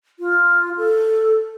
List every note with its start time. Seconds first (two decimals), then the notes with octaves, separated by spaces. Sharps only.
0.19 F4
0.77 A4